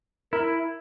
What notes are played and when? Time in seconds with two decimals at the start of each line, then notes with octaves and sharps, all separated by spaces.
0.33 E4 A#4